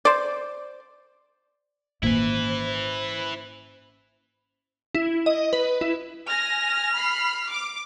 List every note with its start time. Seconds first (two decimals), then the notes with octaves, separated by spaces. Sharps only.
0.05 C5 D5
2.03 G#1 A#2 A#3 C#4 E4 B4 C5
4.95 E4
5.26 D#5
5.53 B4
5.81 E4
6.28 G#5 F6 A#6
6.96 B5 C7
7.50 D6